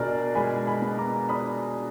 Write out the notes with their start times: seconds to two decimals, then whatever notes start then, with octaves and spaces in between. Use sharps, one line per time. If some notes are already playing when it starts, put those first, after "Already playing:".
Already playing: B2 D4 G#4 A#4 D5
0.35 G#3 G#5 B5
0.66 G#5 B5
0.82 B3
0.98 A#5 D6
1.29 D4 B5 D#6